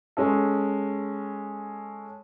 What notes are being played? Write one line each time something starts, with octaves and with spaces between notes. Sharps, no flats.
G#3 C#4 A4